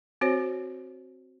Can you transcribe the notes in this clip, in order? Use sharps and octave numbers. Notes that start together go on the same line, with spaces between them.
C4 F#4 C5 C#5